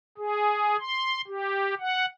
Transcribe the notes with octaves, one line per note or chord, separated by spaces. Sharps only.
G#4
C6
G4
F#5